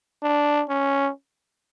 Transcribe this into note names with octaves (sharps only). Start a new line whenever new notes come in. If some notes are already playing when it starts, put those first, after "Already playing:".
D4
C#4